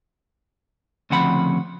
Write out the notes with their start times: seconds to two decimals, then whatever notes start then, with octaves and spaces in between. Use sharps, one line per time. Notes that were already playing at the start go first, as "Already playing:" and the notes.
1.10 D2 C#3 F3 C4 F#5 B5